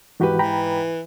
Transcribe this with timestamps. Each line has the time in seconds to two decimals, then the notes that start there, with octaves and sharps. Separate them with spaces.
0.20 G#2 E3 F#4 G4 B4
0.39 E3 G5 A#5 B5